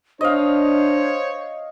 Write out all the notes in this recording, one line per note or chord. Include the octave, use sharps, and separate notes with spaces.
D4 C5 C#5 D#5 F5